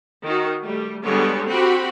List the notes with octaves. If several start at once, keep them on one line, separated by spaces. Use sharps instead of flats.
D#3 F#4
G3 A3
D3 G3 G#3 B3 C#5
C4 F#4 G4 B5